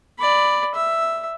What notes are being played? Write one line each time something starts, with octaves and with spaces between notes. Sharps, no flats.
D5 B5
E5